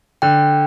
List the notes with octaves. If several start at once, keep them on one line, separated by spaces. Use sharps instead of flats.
D3 G5